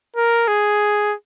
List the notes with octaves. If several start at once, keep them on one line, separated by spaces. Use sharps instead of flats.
A#4
G#4